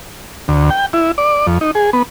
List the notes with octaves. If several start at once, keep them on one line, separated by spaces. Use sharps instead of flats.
D2
G5
E4
D5
F2
D#4
G#4
B3